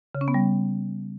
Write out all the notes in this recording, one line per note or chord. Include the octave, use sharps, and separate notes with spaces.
C#3
C#4
B3
G3